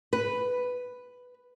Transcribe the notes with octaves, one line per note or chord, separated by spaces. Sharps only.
B4